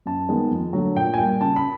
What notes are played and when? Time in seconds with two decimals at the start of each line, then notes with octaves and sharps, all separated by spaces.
0.06 F#2 A5
0.29 D#3 G#3 B3
0.51 F2
0.73 D3 F#3 A3
0.96 A#2 G5
1.14 G#5
1.18 G3 A#3 G5
1.41 C#3 A5
1.56 B5